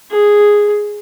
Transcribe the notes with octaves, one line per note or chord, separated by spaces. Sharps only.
G#4